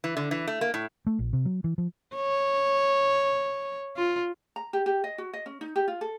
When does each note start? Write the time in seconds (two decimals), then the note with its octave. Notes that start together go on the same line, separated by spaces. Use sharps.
0.04 E3
0.17 D3
0.31 E3
0.47 A3
0.61 A#3
0.74 A2
1.07 A3
1.19 A#1
1.33 C3
1.45 F#3
1.64 E3
1.78 F3
2.16 C#5
3.97 F4
4.56 A#5
4.73 G4
4.86 G4
5.04 D#5
5.18 F#4
5.33 D#5
5.46 C#4
5.61 D#4
5.76 G4
5.88 F4
6.01 A4